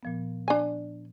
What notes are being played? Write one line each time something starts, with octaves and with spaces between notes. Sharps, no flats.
A#2 F3 B3
D4 G#5